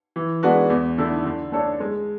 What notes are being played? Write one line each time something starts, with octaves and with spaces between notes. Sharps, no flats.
E3
G#3 B3 D4 F#4
E2
D3 A3 E4
D3
A3 D4 A4 C#5
G#3